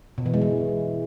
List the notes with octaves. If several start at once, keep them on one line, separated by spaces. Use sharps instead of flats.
B2
E3
G#3
E3